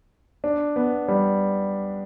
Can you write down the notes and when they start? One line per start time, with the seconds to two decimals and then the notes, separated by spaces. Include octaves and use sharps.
0.44 D4
0.76 B3
1.09 G3